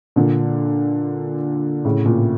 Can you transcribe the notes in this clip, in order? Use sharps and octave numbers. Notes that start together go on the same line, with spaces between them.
A#2 D3
A2 C#3
A#2